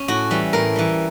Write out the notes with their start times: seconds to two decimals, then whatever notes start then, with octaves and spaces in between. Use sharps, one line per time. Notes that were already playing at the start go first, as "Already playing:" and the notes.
Already playing: C#4
0.08 A2 F#4
0.31 E3 G3
0.53 A2 A#4
0.76 E3 G3